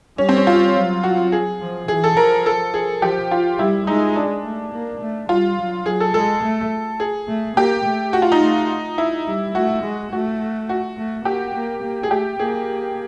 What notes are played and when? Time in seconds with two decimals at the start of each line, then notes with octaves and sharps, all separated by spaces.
0.18 G3 C#4
0.29 C4
0.37 C#4
0.47 F4
0.75 F#3
1.03 F#4
1.32 G#4
1.61 F3
1.88 E3 G#4
2.04 A4
2.17 F3 A#4
2.46 A4
2.74 G#4
3.02 F3 G4
3.31 F4
3.59 G3 E4
3.87 G#3 D#4
4.16 D4
4.44 A3
4.73 A#3
5.01 A3
5.29 G3 F4
5.58 F#3
5.86 F#3 G#4
6.00 A4
6.14 G#3 A4
6.44 A3
7.00 G#4
7.28 A3
7.57 A#3 G4
7.85 A3
8.13 F#4
8.22 F4
8.32 D#4
8.41 A3
8.98 E4
9.26 G3
9.55 A3 F#4
9.84 G#3
10.12 A3 F#4
10.69 F#4
10.97 A3
11.25 A#3 G4
11.54 A#3
11.83 A#3
12.03 G#4
12.10 A3 G4
12.39 A#3 G#4